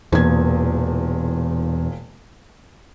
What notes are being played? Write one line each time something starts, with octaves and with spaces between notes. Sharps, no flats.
E1 E2 A#2 G#6